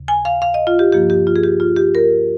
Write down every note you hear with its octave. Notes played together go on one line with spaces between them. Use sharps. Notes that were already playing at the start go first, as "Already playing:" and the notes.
Already playing: D#2 C#3
G#5
F5
F5
D#5
F4
G4
G2 F3 A#3 G4
G4
F4
G#4
G4
F4
G4
A#4